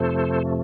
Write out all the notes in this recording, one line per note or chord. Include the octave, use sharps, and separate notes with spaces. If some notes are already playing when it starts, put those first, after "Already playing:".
Already playing: F2 C3 F3 A3 A4 C5